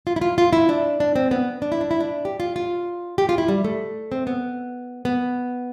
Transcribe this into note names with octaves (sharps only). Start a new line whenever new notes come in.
F4
E4
F4
F4
E4
D4
D4
C4
B3
D4
E4
D4
E4
D4
G4
F4
F4
G4
F4
E4
G3
A3
C4
B3
B3